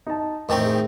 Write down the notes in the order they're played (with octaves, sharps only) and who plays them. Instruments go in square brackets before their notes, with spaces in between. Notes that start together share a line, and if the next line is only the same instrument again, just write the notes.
[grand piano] D#4 A5
[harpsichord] A2 D#3 C4 [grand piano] D#5 G5 C#6
[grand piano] G#4